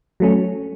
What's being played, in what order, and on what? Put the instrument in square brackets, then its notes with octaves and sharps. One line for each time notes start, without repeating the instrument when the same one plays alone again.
[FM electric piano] F#3 A3 C#4